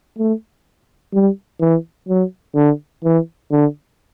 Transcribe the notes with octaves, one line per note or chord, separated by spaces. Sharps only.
A3
G3
E3
F#3
D3
E3
D3